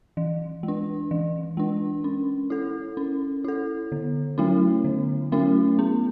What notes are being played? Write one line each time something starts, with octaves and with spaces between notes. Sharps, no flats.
E3
G#3
D4
E3
G#3 D4
C#4
E4 A4
C#4
E4 A4
D3
F#3 A3 C#4 E4
D3
F#3 A3 C#4 E4
B3